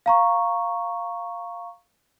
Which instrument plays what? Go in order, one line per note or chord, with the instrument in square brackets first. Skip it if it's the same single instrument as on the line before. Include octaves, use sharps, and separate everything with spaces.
[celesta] F5 A#5 C#6